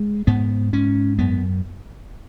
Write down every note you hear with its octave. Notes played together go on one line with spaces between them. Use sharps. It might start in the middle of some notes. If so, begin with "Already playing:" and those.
Already playing: G#3
G#2 B3
G#2 C#4
F#2 B3